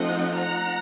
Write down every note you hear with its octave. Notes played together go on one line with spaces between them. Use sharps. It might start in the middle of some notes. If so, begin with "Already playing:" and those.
Already playing: F3 A3 C4 D#4 D#5 F#5
F#5 A#5